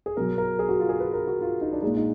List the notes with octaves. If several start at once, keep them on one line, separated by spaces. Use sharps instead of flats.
G#4
B2 F#3 A#4
A#4
G#4
F#4
F4
G#4
B4
A#4
F#4
F4
D#4
D4
A#2 G#3 D#4
D#4